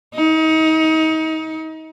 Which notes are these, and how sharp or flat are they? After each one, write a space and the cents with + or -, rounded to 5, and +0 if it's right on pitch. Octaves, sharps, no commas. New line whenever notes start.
D#4 +30